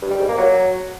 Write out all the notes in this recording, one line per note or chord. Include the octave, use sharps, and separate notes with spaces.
G2
G3
G#2
A#3
F#3